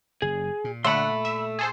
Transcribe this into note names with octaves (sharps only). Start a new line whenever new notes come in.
F#1 G#4
A#2
D3 A3 F#5 B5 C6
E5
G#4 A4 C5